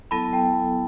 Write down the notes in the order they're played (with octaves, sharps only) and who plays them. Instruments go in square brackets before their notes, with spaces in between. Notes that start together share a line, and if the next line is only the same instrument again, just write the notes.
[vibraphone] F#3 B3 E4 A4 [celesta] A5 B5
[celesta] G5 A5